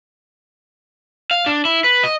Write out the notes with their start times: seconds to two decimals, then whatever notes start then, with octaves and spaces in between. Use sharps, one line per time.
1.31 F5
1.46 D4
1.65 E4
1.84 B4
2.04 D#5